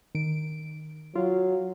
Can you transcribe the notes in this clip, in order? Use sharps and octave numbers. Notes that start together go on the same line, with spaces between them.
D#3 D7
F#3 F4